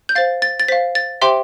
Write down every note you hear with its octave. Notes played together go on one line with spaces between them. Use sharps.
G6
C5 F5 A6
A6
A6
C5 F5 B6
A6
G4 C5 E5 G5 C6